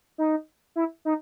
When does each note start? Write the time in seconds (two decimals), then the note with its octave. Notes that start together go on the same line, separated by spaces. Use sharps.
0.18 D#4
0.76 E4
1.05 D#4